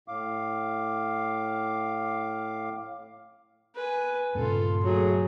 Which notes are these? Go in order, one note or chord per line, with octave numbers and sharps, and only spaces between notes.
A2 F5 D6
B4 G#5
G2 A#2 C#3 F4 A4
F#3 A3 G#4